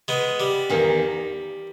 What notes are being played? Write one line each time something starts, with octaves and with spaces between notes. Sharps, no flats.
G#3 B3
G3
E2 D#3 A#3